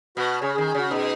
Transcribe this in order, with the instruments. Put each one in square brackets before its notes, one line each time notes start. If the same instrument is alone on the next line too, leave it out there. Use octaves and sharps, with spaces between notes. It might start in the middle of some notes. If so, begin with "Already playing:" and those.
[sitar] B2 [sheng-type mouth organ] F#4 B4
[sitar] C#3 [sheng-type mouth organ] G#4 C#5
[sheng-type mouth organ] G#4
[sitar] D#3
[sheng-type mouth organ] G#4
[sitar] C#3 [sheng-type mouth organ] F#4
[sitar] B2 [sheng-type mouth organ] D#4